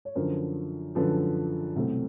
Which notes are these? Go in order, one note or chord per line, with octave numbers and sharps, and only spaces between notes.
C#5
F#2 D3 F3 A#4 C5
F#2 D3 F3 A4 B4
C2 B2 F#3 A3 C4